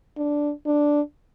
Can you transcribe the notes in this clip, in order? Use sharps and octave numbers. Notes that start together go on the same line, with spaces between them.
D4
D4